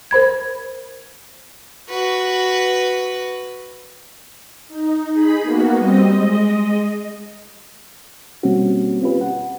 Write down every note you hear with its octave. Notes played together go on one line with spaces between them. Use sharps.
A#4 C5 B5 G#6
F#4 B4
D#4
D#4 G#4 B5
A#3 B3 F#4
G3 C4 D#5
G#3 D#5
B2 G3 A#3 C4 C#4 F#4
C4 C#4 F4 G4 B4
F#5